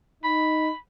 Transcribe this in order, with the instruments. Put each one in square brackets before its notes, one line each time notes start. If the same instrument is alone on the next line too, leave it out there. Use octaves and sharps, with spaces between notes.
[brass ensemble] D#4 [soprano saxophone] B5